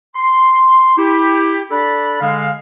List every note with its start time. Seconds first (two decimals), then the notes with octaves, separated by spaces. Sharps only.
0.16 C6
0.98 E4 G4
1.71 D4 A4 D5 B5
2.20 D3 G#3 F5